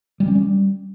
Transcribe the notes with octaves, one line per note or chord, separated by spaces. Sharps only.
G3
C#4
G3